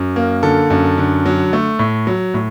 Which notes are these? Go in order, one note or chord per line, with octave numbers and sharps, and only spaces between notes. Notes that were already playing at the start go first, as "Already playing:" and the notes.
Already playing: F#2
A#3
D3 A4
F#2
D3
F#3
A3
A2
F#3
A2